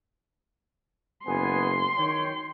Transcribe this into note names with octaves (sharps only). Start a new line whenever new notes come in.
F#1 B3 G#5 C6
D#3 C#5 G5